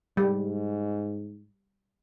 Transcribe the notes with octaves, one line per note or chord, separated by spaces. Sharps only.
G#2 G3